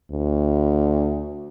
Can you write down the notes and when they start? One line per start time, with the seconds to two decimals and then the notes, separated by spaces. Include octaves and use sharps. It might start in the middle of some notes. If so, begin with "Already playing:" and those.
0.11 D2